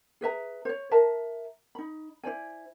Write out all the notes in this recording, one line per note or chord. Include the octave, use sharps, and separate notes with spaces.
G#4 B4 E5 A#5
C5 C#5
A#4 E5 A5 A#5
D#4 B5
E4 C5 D5 G#5